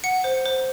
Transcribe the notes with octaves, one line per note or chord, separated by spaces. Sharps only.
F#5 C#7
C5
C5